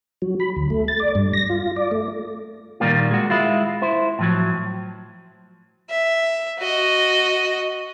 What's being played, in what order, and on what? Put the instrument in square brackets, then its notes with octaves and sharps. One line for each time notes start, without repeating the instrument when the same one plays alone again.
[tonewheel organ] F#3
B5
D2
A3
A6
D5
G2
A#6
F4
D5
A3
[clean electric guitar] A#2 D#3 G3 A#3 F4
G#3 F#4
G#3 E4 F4
E4 C5
A2 F3 F#3
[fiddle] E5
F#4 D#5